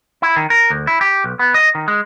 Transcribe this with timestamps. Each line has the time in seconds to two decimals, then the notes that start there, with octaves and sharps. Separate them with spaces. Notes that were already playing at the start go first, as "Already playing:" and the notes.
0.22 E4
0.36 D#3
0.50 A#4
0.70 D2
0.87 E4
1.01 G4
1.24 B1
1.39 B3
1.54 D#5
1.75 D#3
1.88 G#3